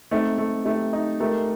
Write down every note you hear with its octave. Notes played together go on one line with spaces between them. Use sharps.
A3 C4 D#4
A3
A3 D#4 G4
D#4
A3 G4 A#4